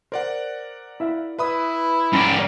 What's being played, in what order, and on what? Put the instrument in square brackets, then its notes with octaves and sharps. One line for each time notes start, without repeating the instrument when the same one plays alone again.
[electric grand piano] A#4 D5 F#5 [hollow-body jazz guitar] C5
[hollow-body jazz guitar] E4 E5 F5
[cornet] E4 [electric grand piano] B4 B5 D#6 [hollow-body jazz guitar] E5
[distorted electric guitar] G#2 D5 [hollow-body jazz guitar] C#4 [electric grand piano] G5 A#5 B5